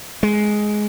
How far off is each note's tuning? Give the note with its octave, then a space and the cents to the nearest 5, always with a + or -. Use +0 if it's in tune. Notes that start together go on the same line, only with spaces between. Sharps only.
G#3 +10